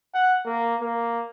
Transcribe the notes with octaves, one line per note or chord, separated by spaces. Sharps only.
F#5
A#3
A#3